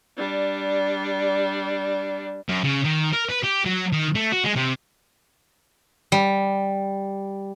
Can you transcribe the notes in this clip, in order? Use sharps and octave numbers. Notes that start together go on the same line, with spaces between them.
G3 D4
F#2
C#3
D#3
A#4
B4
G4
F#3
D#3
A3
F#4
G#3
C3
G3